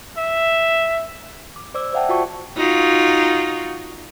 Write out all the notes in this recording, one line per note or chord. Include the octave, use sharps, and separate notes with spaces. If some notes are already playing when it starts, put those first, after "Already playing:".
E5
D6
C5 D5 D6 E6
C5 D5 E5 F#5 G5 A5
F4 F#4 A5 C#6
D#4 F4 F#4